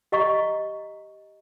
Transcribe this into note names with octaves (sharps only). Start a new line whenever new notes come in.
G4 D#5 F5 A#5 C#6